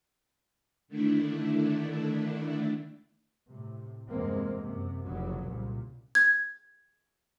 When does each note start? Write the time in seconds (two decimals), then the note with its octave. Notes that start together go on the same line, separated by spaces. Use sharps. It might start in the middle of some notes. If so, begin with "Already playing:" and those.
0.88 D3 D#3 A3 D4 E4
3.50 A2 C3
4.09 E2 G2 C3 G#3 A#3 C4
4.61 F#2 C3
5.05 F1 A#2 C#3 F#3
5.45 C2 A#2
6.15 G#6